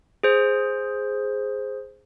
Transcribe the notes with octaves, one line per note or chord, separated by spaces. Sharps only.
G#4 C5